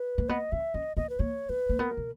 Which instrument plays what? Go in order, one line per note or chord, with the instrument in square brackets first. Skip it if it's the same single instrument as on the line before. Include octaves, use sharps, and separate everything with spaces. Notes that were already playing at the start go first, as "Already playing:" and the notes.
Already playing: [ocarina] B4
[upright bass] A#3
[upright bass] B3 [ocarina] D#5
[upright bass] C#4 [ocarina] E5
[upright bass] C#4 [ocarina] D#5
[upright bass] B3 [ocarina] D#5
[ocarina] B4
[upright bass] A#3 [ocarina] C#5
[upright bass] B3 [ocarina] B4
[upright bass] A#3
[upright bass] B3 [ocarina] A#4
[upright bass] B2